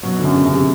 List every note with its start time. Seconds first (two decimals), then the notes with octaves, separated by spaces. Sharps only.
0.03 B2 F#3
0.19 D3
0.24 F#2
0.35 C#3
0.46 F#2
0.52 C3